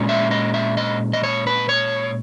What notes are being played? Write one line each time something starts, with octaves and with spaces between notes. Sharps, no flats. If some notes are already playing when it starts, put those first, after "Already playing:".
Already playing: A#2 G#3 C#4
E5
D#5
E5
D#5
D#5
C#5
B4
C#5